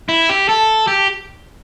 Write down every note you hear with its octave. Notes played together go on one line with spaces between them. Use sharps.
E4
G4
A4
G4